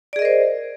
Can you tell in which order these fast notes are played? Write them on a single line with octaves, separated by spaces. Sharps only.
D5 G#4 D#5 A#4 C5